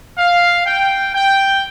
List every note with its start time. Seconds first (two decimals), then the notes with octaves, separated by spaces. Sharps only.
0.18 F5
0.66 G5
1.14 G5